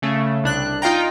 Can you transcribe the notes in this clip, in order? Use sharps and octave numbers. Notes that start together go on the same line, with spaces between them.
C#3 A3
C2 D4 F#6
D#4 F4 F5 G5 A#5